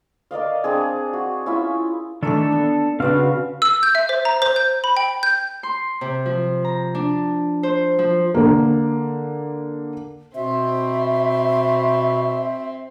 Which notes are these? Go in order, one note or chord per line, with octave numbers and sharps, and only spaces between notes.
A#4 D5 D#5 F5
C4 D4 G#4
F#4
C#4 E4 F4 E5
D#3 E3 A3 D4 A4
B3
C#3 C4 D4 F#4 B4 F5 F#5 F6
E6
G6
E5
C5
A#5
C5
G6
B5
G5
G6
C6
C3
F3
A#5
D4
C5
F3
D3 A#3
B2 C4 E5